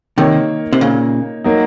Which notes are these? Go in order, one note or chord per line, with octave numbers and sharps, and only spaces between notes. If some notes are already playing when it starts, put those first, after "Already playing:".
C3 D#3 A#3 D#4 A#4 C#5
C3
A#2 C#3
F#3 A#3 D#4